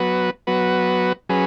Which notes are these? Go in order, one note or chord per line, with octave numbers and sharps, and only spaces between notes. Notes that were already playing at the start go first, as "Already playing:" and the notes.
Already playing: F#3 B3 F#4 B4
F#3 B3 F#4 B4
F#3 C#4 G#4 B4